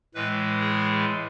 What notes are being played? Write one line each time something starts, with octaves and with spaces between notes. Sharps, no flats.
A2 E3 G#3 B4
G#4